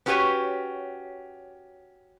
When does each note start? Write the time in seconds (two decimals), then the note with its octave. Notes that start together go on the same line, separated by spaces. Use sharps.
0.06 B3 C#4 F#4 G4 B4 C#5